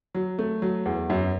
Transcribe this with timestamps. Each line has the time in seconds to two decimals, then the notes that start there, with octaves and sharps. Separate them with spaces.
0.15 F#3
0.39 A3
0.62 F#3
0.85 E2
1.10 F#2